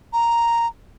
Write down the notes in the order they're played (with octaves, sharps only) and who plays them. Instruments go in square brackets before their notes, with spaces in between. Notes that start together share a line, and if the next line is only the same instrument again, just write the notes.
[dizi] A#5